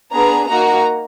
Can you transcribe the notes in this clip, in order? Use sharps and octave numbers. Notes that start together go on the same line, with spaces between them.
B3 D4 G#4 A#5
A#3 D#4 F#4 A#5